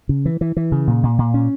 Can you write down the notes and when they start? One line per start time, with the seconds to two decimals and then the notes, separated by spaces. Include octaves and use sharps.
0.09 C#3
0.26 E3
0.41 E3
0.57 E3
0.72 C#3
0.87 A#2
1.03 A#2
1.19 A#2
1.34 C#4